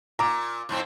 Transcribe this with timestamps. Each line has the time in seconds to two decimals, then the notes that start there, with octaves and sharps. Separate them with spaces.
0.19 A#2 A#5 D6
0.69 F2 G#2 C4